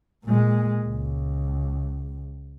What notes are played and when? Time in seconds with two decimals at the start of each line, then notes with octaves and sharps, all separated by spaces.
0.24 A#2 G#3
0.84 C#2